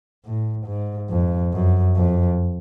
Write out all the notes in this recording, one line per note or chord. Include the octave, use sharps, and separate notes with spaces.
A2
G#2
F2
F#2
F2